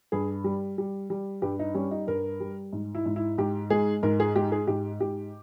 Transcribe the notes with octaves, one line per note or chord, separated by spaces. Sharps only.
G2 G#4
G3
G3
G3
G2 G4
D#4
G3 C#4
D#4
G2 A#4
G3
G#2
E4
G#2
E4
G#2 G4
G#3 G#4
G#2 A#4
G#4
G#3 G4
G#4
G#2 G4
G#2 G4